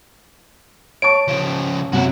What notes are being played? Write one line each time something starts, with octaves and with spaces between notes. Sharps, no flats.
C#5 A5 C#6 D7
C#3 F3
F#2 C3 E4 F#4